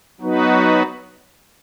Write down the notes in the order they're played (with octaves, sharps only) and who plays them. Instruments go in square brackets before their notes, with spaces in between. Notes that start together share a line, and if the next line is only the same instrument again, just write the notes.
[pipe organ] F#3 B3 D#4 F#4 B4